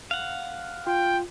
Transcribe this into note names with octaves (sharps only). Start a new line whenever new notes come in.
F5 F#5
F4 G5